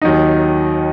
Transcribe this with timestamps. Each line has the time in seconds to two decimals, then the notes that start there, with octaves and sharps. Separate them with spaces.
0.02 D#2 D#3 F#3 D#4